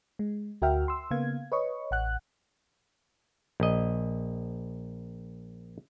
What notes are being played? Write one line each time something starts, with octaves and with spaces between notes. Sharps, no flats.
G#3
D2 F#4 A#4 E5 G5 F6
C6 E6
C#3 A#3 B3 F5 G#6
B4 C#5 D#5 C#6
A1 F#5 F#6
A#1 D#5